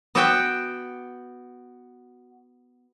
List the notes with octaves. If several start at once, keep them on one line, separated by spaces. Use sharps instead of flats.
B3 F#4 D5 E5 G5